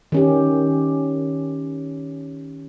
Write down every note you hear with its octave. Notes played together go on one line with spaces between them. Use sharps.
D#3 C#4 G4